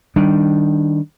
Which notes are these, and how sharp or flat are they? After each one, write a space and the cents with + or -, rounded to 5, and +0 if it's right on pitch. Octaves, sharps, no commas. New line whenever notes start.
D#3 +0 G3 +0 D4 +0